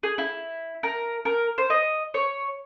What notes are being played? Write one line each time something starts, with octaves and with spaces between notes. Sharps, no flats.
G#4
E4
A#4
A#4
C5
D#5
C#5